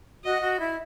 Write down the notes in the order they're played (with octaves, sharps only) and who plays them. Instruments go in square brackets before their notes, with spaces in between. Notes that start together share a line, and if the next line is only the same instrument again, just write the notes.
[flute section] F#4 [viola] D#5
[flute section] F#4
E4